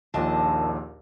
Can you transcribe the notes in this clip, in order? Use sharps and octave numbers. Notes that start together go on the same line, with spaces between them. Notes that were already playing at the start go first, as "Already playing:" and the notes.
A#1 D#2 A#2 D4 D#5 A5